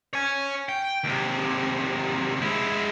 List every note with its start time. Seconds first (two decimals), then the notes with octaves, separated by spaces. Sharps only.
0.13 C#5 G#5
0.69 G5
1.04 D#2 C3
2.42 G#3 E4